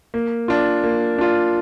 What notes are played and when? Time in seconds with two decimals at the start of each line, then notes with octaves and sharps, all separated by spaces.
0.14 A#3
0.48 D4 F4
0.84 A#3
1.18 D4 F4